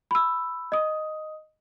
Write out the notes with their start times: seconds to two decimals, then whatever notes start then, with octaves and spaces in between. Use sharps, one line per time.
0.11 B5 E6
0.72 D#5 D#6